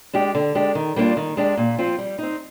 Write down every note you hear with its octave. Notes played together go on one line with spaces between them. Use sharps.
G#3 D4 G4
D3
G#3 D4 G4
D#3
G3 A#3 D4 F4
D#3
G#3 D4 G4
A#2
F3 C4 F4
G3
C4 D#4